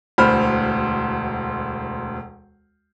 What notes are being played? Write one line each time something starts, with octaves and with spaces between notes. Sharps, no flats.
E1 D2 C5 B5 F6